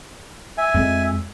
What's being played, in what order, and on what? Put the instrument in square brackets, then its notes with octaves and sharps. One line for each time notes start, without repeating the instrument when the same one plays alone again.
[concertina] E5 G#5
[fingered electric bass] F2 G#3